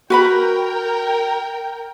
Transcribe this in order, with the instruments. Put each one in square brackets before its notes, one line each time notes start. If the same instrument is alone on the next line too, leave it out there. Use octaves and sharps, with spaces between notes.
[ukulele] F#4 B4 B5 [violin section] A#4 G5